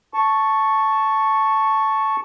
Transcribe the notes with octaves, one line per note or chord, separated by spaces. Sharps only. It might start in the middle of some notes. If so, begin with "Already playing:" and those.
A5 C#6